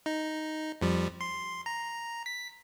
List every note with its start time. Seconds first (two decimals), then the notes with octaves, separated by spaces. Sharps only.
0.06 D#4
0.81 F2 F3 G3
1.21 C6
1.66 A#5
2.26 B6